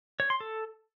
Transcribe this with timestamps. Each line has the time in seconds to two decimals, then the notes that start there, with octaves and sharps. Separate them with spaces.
0.20 C#5
0.30 C6
0.40 A4